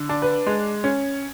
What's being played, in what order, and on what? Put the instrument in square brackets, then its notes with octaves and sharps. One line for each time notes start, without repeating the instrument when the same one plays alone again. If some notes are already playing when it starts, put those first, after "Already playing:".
Already playing: [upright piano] D3
D4
B4
G#3
C#4